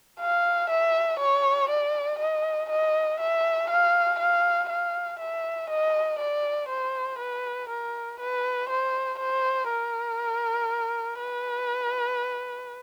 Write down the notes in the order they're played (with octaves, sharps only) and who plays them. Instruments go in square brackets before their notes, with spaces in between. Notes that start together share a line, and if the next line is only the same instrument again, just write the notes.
[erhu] F5
E5
C#5
D5
D#5
D#5
E5
F5
F5
F5
E5
D#5
D5
C5
B4
A#4
B4
C5
C5
A#4
B4